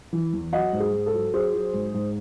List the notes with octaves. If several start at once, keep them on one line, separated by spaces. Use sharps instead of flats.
E3
E2
F#3 D#5 F#5
G#2
G#4
G#2
A4
F#3
F#3 G#4 C5
F#3
G#2
G#2